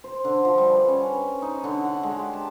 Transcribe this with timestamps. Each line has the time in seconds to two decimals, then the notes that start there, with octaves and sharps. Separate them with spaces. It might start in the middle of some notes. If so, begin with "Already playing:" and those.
0.04 C5
0.25 D3
0.45 F3
0.58 G3
0.74 B4
0.88 C#4
1.42 D#4
1.64 D3
1.85 F#5
2.03 G#3
2.17 G4
2.33 A5